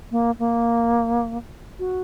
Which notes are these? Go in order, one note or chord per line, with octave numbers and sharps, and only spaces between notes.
A#3
A#3
F#4